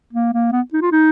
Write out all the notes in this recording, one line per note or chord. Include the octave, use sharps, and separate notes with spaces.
A#3
A#3
B3
D#4
F4
D#4